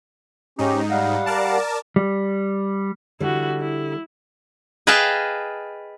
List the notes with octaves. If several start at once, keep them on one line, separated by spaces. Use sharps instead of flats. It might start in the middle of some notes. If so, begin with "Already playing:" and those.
G#2 C#4 D#4 G4
G3 F5 F#5
A#4 D5 A5
G3
D3 G3 E4 F#4
E4
G#4 B4 D#5 F5 G5 A5